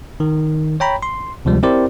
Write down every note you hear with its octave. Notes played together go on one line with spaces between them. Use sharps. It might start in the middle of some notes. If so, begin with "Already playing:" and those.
D#3
C#5 G5 A#5 B5
C6
D2 C3 F3 G3 G#3
C4 E4 G4 A#4 C5 D5